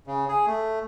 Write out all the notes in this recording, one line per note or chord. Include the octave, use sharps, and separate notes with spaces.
C#3
G#4
A3